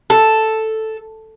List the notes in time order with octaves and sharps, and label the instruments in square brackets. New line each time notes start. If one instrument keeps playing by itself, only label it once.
[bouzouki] A4